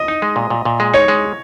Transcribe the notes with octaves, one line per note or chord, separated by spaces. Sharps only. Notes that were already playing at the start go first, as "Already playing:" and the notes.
Already playing: D#5
D#4
G#3
A#2
A#2
A#2
G#3
D#4 C#5
G#3